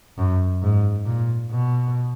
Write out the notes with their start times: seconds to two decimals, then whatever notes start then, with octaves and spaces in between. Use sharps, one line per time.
0.18 F#2
0.62 G#2
1.06 A#2
1.50 B2